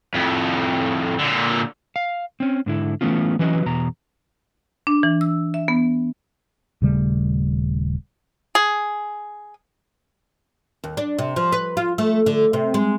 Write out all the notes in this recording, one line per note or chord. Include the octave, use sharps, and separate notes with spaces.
F2 A2
A#2 D3
F5
C4 C#4
G#2 D3 E4
E3 A3 B3 C#4 F4
E3 F#3 C#4 B4 D#5
E2 B2 A#5
D4
E3
E6
E5
B3
D#1 C#3 G3 A3
G#4
D#2
D4
C3
F3
B4
F4
A3
D3
C3
G#3